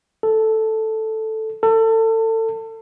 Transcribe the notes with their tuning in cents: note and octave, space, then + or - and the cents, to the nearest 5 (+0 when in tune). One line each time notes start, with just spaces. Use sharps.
A4 +0
A4 +30